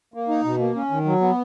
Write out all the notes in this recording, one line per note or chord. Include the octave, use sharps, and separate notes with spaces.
A#3
D#4
B2
A#3
C#4
D#3
F#3
B3